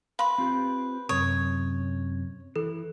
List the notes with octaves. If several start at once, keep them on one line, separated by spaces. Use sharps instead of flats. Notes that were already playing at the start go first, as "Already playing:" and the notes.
B4 F5 C6
C4 F4 G4
F#2 C3 C#5 D#6
E3 A4